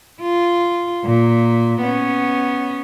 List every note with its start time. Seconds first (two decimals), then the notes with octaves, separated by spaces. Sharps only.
0.21 F4
1.05 A#2
1.81 B3 C#4